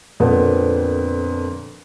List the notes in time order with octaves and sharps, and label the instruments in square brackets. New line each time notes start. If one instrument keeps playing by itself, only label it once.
[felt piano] F2 A#2 D3 B3 C4